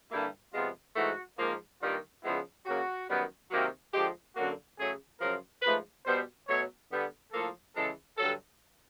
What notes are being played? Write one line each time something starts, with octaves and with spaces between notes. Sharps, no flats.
G2 D3 G3 A#3 E4
C3 F3 G#3 B3 F4
G#2 E3 A3 F#4
G#2 F3 A#3
G2 D#3 G3 A#3 F4
C#3 F3 G#3 B3 E4
C#3 F#3 A#3 F#4
F#2 D#3 G3 B3
C3 D#3 F#3 A#3
D3 F3 G#3 G4
F#2 D3 F#3 A#3 F#4
C#3 F#3 A3 G#4
F#2 C#3 F3 A#4
G#2 F3 A3 B4
B2 G3 B3 C5
B2 F#3 A3 C#5
D3 G3 B3
A2 F3 A#3 A4
C#3 E3 G#3 A4
G2 D3 F#3 A4